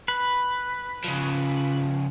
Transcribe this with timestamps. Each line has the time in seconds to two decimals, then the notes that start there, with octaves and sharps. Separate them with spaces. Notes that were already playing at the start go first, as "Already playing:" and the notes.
0.08 B4
1.04 C#3 F3